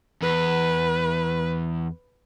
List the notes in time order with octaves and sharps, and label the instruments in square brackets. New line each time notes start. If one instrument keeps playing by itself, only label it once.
[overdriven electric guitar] E2 [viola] B4